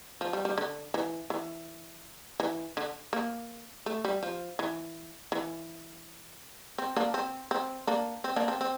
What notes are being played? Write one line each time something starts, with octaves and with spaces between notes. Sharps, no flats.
F3
G3
G3
D3
E3
E3
E3
D3
A#3
A3
G3
F3
E3
E3
C4
A#3 D4
C4
C4
A#3 D4
C4
A#3 D4
C4
C4